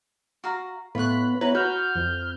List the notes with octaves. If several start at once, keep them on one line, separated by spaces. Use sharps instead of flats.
F#4 F5 A#5
A2 B3 F4 C#5 B5 F#6
B3 E4 B4 C#5 A#5
F#4 B4 F6 G6
F2